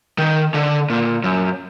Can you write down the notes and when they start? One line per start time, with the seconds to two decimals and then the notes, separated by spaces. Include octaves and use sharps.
0.18 D#3
0.54 D3
0.90 A#2
1.24 F#2